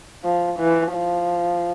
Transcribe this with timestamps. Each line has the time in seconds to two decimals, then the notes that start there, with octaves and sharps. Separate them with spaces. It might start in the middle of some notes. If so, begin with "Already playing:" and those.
0.25 F3
0.59 E3
0.93 F3